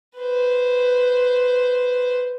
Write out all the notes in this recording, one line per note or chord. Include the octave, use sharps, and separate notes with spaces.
B4 C5